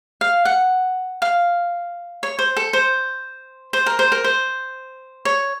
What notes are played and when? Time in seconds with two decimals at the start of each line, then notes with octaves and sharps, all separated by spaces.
0.21 F5
0.45 F#5
1.22 F5
2.23 C#5
2.39 C5
2.57 A4
2.73 C5
3.73 C5
3.86 A#4
3.99 C5
4.12 A#4
4.24 C5
5.25 C#5